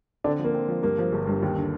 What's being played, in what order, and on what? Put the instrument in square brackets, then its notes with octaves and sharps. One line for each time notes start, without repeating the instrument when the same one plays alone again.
[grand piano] D3 D4 [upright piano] C4
[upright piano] F3
[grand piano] A#3
[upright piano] C4
F3
[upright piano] G2 [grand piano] A#3
[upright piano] F3
G1
G2
D#2
D3